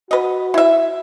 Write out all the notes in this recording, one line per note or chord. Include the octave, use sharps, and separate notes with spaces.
F#4 B4 D#5
E4 E5